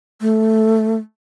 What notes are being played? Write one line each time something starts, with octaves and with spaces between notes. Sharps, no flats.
A3